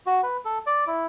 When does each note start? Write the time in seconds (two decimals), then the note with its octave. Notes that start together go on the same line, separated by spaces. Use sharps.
0.06 F#4
0.23 B4
0.45 A4
0.67 D5
0.87 E4